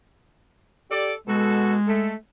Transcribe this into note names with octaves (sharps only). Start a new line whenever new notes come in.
G4 A4 D5
B2 G#3 F#4 A4
A3 A4